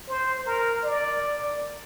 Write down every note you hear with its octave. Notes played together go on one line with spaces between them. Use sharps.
C5
A#4
D5